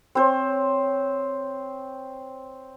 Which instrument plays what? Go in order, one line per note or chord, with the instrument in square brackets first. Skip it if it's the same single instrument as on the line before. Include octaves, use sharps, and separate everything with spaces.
[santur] C4 C5 C#5